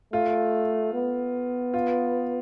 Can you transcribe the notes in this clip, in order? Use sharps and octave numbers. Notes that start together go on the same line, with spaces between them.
A3 F4
B3
F4